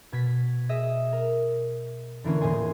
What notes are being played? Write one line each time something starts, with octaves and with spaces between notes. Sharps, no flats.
B2 G#6 B6
G#4 D#5 E5 D#6
A#4
D3 E3 A#3 C#4
D#1 A2 A#3 D#5 G#5 C6